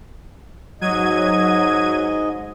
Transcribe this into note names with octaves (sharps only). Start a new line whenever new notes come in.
G#2 F#3 D#5 G#6 D#7